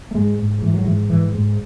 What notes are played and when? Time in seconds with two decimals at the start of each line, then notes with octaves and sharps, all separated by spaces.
0.11 A3
0.15 G#2 G#3
0.39 G#2
0.62 G#2 E3
0.74 F#3
0.84 G#2 E3
1.10 G#2 E3
1.34 G#2